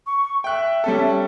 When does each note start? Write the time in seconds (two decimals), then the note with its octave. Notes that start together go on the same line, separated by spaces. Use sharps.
0.07 C#6
0.44 E5 G5 F#6
0.84 G3 C#4 A4